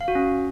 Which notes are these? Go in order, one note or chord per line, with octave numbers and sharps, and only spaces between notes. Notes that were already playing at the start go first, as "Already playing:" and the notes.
F5
F#4
C#4